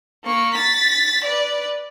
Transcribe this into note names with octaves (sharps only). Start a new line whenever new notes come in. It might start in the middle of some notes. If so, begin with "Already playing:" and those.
A#3 C#6
A6 B6
B4 D5